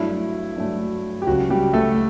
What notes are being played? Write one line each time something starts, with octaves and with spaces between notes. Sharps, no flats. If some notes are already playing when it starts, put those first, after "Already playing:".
Already playing: G2 F#3 A3 E4
G2 F#3 A3
G4
C#2 C#3 F#3 F#4
G3 G4
A3 A4